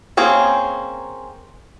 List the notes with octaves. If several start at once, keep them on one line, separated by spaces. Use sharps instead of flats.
A#3 C4 C#4 G#4